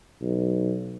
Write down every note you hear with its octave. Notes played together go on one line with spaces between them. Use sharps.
B1